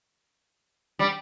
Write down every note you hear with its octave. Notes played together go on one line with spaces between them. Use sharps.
G3